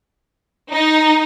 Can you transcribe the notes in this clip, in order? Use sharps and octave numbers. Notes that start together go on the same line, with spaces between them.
D#4